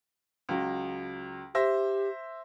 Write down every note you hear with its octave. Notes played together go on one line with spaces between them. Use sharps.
C#2 F#3
G4 C5 E5 A#6